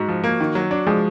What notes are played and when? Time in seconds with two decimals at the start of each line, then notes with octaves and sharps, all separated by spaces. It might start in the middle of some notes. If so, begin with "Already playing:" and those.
Already playing: G#2 F#4
0.09 F3
0.24 A#3
0.40 D#3
0.55 F#3
0.71 D4
0.87 F3 G#3